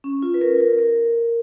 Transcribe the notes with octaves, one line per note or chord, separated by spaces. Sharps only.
C#4
F4
B4
A#4
A#4
A#4